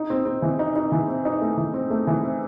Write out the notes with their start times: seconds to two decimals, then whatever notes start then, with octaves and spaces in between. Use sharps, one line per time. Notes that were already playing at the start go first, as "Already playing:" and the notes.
Already playing: D#4
0.10 C4
0.25 C4
0.42 E3
0.59 D#4
0.76 D#4
0.92 E3
1.08 C4
1.25 D#4
1.41 A3
1.57 E3
1.74 C4
1.90 A3
2.07 E3
2.24 C4